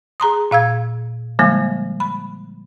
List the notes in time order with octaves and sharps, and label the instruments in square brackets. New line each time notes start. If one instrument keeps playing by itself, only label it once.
[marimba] G#4 A#5 C6 D#6
A#2 F5 E6 G#6
D3 F3 G3 G#3 A#3
B5